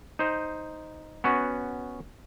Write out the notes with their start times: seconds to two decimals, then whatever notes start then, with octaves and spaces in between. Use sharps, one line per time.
0.19 D#4 C5
1.24 B3 C#4 F#4